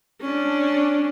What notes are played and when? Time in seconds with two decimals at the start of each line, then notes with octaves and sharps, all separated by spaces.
0.21 C#4 D4